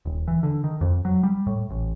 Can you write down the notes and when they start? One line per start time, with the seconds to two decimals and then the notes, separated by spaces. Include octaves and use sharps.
0.05 D#1
0.28 E3
0.43 D3
0.64 D#3
0.81 F2
1.05 F#3
1.23 G3
1.47 A2
1.70 A1